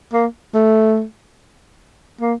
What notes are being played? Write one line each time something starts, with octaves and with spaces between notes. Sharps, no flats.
A#3
A3
A#3